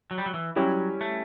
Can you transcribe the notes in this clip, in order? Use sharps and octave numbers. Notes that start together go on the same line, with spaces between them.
F#3
G3
F#3
E3
F#3 G3 C#4 E4 G4
A3